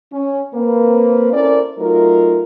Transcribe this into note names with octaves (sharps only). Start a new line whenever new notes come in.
C#4
A#3 C4 B4
C#4 E4 A4 A#4 C5 D5
F#3 A3 D#4 F4 A#4